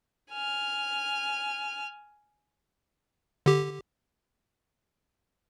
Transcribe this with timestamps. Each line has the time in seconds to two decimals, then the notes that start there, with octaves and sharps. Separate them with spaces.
0.32 G#5 F6
3.46 D3 G4